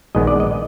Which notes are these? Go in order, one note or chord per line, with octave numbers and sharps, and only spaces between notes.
A#1 G#2 D#3 G#3 B3 D#5
D5
D#5